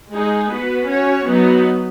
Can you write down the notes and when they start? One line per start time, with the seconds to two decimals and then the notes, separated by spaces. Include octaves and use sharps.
0.12 G#3 D#4 G#4
0.51 B3 F#4 B4
0.89 C#4 F#4 C#5
1.27 F#3 B3 D#4